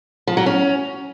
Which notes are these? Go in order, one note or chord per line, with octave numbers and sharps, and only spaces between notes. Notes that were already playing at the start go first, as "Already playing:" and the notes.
F3
F#3
C#4